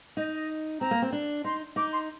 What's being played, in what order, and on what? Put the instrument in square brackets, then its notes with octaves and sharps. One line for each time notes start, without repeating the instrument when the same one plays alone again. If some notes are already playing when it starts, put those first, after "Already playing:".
[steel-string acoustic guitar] D#4 [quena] D#5
[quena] D#5
[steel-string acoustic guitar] C4 [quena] A#5
[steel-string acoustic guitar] A#3
C4
D4
[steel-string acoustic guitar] D#4 [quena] C6
[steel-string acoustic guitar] D#4 [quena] D6
[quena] C6